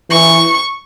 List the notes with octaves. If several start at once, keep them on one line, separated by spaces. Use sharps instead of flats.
E3 C#6